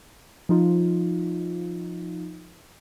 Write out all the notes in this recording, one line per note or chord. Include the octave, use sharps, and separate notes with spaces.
F3 D#4 F4